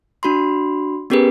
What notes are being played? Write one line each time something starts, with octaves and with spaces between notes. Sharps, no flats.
D4 F#4 B5 C6
B3 C#4 G4 G#4 A#4 B4